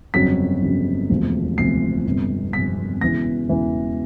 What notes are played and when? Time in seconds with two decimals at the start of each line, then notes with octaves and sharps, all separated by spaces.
0.14 G1 F2 C#3 F#3 B6
0.62 G1 F2 C#3 F#3
1.10 E1 D2 C3 F3
1.58 E1 D2 C3 F3 C7
2.05 G1 F2 C3
2.53 G1 F2 C3 B6
3.01 E1 E2 C#3 E3 A#6
3.49 E1 E2 C#3 E3